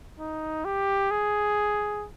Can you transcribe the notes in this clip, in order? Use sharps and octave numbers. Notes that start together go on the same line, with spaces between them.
D#4
G4
G#4